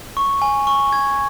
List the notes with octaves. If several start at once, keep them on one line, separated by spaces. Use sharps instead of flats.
C#6
G#5
C#6
G#6